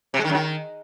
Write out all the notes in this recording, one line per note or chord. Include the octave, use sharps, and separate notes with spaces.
C3
G#3
D#3
F#2
D#3